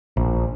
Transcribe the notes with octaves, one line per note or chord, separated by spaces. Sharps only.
A#1